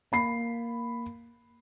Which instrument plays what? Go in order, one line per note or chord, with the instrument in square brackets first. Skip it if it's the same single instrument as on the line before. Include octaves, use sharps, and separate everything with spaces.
[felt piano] A#3 B5 C7